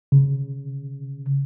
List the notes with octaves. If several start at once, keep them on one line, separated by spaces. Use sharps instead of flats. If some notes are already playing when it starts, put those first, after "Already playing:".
C#3